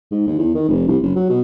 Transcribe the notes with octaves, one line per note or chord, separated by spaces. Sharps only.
G#2
D#2
E2
D#3
F1
C2
F#1
F#3
B2